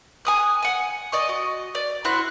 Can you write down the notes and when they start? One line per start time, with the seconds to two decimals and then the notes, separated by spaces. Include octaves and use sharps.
0.25 G#5 D#6 F#6
0.62 F#5 G#5
1.12 D5 D#5 C#6
1.29 F#4
1.75 D5
2.05 E4 F#4 C5 F#6